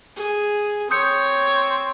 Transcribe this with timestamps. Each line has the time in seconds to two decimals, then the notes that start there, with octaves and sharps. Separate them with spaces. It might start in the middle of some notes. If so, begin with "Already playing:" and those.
0.16 G#4
0.91 C4 C#5 D#6 G6 C#7